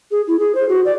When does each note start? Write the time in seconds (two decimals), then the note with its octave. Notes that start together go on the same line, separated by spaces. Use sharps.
0.11 G#4
0.27 E4
0.39 G#4
0.55 C5
0.69 F#4
0.85 D5